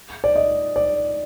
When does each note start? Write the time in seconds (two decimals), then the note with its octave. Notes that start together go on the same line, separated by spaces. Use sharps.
0.24 D5
0.36 D#5
0.76 D5